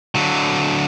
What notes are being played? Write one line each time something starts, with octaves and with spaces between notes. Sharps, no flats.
D3 F#3